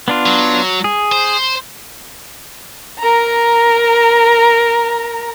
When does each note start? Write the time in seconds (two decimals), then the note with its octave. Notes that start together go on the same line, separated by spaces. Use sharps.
0.08 B3 D4 F4
0.26 F#3
0.84 G#4
1.12 C5
3.00 A#4 A#5